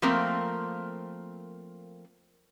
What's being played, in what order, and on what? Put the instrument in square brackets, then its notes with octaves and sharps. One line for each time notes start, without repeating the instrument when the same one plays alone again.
[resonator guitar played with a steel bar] F3 A3 A#3 C4 A#4